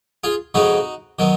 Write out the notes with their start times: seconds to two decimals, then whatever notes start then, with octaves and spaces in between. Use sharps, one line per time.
0.24 F4 G#4
0.54 F2 C#3 G#3 B3 D#4 F#4
1.19 D#3 F#3 B3